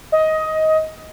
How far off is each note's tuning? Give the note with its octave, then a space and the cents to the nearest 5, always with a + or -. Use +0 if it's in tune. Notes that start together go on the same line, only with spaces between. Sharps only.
D#5 +15